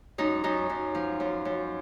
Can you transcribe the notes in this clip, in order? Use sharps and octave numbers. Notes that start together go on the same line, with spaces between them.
F#2 D#4
F#2 D#4
F#2
F3
F#2
F#2